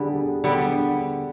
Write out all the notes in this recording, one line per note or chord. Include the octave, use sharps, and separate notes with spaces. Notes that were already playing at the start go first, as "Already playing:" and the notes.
Already playing: D3 G3 B3 G4 G#4
D3 G3 B3